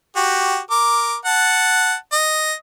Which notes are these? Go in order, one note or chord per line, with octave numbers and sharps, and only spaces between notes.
F#4 G4
A#4 D6
F#5 A5
D#5